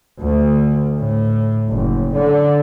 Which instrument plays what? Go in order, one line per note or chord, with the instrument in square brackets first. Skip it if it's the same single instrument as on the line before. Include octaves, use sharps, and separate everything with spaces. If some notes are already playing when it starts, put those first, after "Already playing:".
[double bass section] D2
A2
F#1
D3